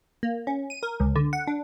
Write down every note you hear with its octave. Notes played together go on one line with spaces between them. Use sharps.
A#3
C#4
D#7
A#4
C#2
D3
F#5
D4